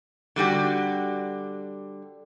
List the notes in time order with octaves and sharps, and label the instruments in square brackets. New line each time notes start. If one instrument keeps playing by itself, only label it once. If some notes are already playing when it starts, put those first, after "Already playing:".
[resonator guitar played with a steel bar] D3 G3 F#4 G4